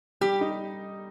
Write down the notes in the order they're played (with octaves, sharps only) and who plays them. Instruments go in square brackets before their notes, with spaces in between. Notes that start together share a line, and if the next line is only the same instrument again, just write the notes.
[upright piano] G3 [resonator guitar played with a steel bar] G4
[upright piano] D#4